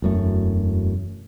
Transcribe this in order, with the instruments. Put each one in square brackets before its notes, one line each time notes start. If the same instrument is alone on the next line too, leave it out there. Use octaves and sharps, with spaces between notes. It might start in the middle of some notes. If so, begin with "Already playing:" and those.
[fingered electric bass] E1 F#2 A3